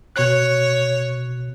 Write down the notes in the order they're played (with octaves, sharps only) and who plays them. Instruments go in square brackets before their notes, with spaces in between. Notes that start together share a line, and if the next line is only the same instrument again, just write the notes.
[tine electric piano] B2 F#6 [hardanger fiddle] C#5